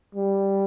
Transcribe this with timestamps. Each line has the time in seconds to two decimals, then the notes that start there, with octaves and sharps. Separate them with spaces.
0.15 G3